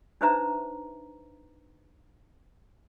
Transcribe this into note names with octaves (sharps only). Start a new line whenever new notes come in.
D4 D#4 B4 C5 E5 A#5